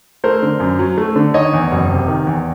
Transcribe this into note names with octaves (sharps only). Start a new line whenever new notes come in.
A3 A#4 C5
D3
F#2
F#3
A3
D3
D#3 C#5 D#5
E2
F#1
C3
D#3
E2